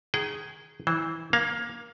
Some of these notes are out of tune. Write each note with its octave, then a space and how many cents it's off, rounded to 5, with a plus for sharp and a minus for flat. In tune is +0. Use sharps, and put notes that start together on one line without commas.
D#3 +0 G#4 +0 G5 -40
E3 -15 C5 +0
A#3 +15 F5 +0